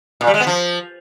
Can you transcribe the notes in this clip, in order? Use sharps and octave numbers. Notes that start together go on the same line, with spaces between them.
A#2
G3
G#3
B3
F3